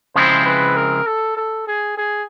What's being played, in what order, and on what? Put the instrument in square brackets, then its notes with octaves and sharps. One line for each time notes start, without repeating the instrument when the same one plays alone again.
[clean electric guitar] C#3 F3 G#3 C4 E4 [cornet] C5
[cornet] B4
A#4
A4
A4
G#4
G#4